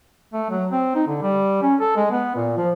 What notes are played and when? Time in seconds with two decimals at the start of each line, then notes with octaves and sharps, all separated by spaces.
0.33 A3
0.50 F#3
0.72 C4
0.95 D#4
1.07 D3
1.22 G3
1.62 C#4
1.80 A4
1.96 G#3
2.11 B3
2.36 A#2
2.57 F3